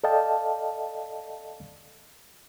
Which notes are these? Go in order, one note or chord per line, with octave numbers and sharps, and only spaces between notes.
A4 D5 D#5 F5 G5 A5